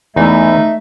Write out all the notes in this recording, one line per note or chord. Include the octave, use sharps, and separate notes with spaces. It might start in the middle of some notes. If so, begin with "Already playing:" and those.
E2 E3 A3 D#4 E5